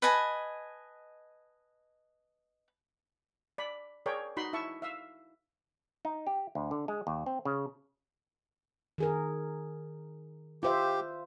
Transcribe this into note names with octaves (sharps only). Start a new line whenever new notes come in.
B4 D#5 G#5 A5
D5 B5
G#4 A#4 C#5 D5 G5
D#4 F#4 B5 C6
E4 E5 A5 C#6
E5 F5 E6
D#4
G4
D2
D3
G#3
D#2
C4
C#3
D#3 G#4 A#4
F4 G4 C5 E5